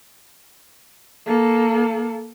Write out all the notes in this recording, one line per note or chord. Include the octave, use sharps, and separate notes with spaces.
A#3 A4